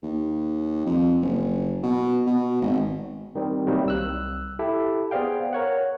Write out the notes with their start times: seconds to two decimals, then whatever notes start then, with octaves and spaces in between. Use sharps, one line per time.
0.03 D#2
0.86 F2
1.22 F#1
1.83 B2
2.27 B2
2.62 G#1
3.35 D#3 G3 C4
3.66 C3 D#3 F#3 G3 A#3 C4
3.86 C2 E6 F#6
4.59 E4 G4 A4 E5
5.11 B3 G#4 C5 D5 F5 G5
5.53 A#4 C#5 F#5